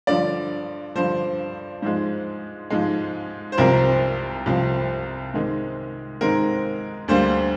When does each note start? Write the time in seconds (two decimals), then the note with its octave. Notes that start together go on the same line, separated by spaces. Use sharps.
0.07 G2 D3 F3 D5
0.95 G2 D3 F3 C5
1.82 G#2 F3 G#3 C5
2.70 G#2 F3 G#3
3.52 C5
3.58 C2 C3 F3 C4 A#4
4.46 C2 C3 F3 C4
5.34 G#2 D#3 G#3 C4
6.21 G#2 D#3 G#3 C4 A#4
7.08 D2 D3 G3 A#3 C5